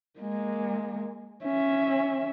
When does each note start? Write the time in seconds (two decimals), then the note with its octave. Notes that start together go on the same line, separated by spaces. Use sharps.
0.19 G#3 A#3
1.44 C#4 E5